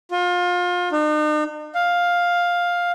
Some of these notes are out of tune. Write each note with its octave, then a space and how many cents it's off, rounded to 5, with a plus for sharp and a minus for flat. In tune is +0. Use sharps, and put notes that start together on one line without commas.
F4 +30
D#4 -45
F5 +10